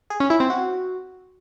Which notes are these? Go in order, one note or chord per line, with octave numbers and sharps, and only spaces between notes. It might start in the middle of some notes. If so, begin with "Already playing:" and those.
G#4
C#4
E4
C4
F#4